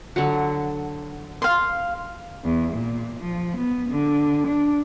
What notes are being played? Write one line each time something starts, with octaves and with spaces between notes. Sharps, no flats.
D3 F#3
F5 C6
E2
A#2
F3
B3
D3
D4